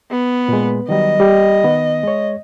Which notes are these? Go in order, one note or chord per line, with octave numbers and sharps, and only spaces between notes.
B3
A#2 G#3
D#3 F#3 G3 D#5
G3 G4
D#3 B3
G#3 C#5